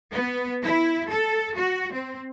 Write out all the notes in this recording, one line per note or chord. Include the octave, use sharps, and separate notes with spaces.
B3
E4
A4
F#4
C4